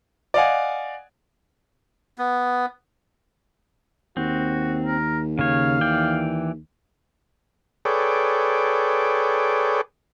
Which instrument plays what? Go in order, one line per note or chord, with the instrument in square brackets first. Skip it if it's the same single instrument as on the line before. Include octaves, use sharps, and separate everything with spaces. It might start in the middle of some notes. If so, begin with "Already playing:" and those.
[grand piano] D5 D#5 F5 F#5 G#5
[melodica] B3
[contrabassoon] D#2 [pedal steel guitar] C4 [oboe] F#4
[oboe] A#4
[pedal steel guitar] C#3 C#5 [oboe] F5
[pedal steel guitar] E3 D5 G5
[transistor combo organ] G#4 A4 B4 C#5 D5 G5